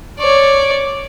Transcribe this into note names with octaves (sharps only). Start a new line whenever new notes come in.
C#5 D5